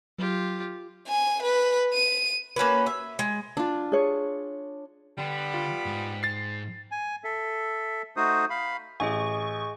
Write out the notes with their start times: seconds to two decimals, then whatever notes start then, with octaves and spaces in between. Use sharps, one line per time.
0.19 F#3 F4 G4
1.08 G#5
1.43 B4
1.93 D#7
2.56 A#3 C#4 F#4 B4
2.86 E5
3.19 G#3
3.57 D4 F4
3.92 G#4 C#5
5.18 D3 G3 B3 B5
5.54 F4
5.86 G#2
6.23 A6 C7
6.91 G#5
7.24 A4 E5
8.17 A3 D#4 F#4 C5 D#6
8.50 F5 B5
9.00 A1 G#4 D#5 G#5 C#6